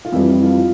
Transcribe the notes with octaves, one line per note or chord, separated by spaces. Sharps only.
F4
F2 E3 G3 E4
E4
F4